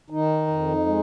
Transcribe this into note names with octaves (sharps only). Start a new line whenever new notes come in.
D#3 D#4
F2
G#3